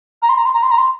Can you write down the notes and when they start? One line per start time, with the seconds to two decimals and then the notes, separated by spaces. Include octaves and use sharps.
0.22 A#5
0.29 C6
0.38 A#5
0.46 C6
0.54 A#5
0.63 C6
0.71 A#5
0.78 C6